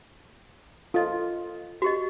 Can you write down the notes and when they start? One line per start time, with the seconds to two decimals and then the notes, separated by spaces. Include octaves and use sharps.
0.94 F4 A4 D#5
1.82 F#4 G4 D#5